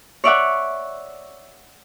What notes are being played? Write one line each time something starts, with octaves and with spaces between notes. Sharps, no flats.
C#5 D5 E5 F#5